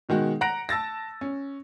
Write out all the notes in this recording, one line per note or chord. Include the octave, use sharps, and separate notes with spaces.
B2 D#3 G#3 F#4
F#5 A#5 F#6 A#6 D7
A5 E6 A6 A#6
C#4